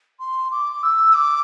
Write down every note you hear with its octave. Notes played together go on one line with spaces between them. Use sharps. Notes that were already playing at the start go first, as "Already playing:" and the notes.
C6
D6
E6
D6